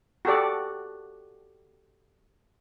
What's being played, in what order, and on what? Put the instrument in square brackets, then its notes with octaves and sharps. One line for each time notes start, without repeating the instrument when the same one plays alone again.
[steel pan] F#4 G4 A4 D5